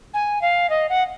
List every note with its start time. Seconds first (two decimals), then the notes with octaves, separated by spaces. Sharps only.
0.14 G#5
0.42 F5
0.70 D#5
0.89 F#5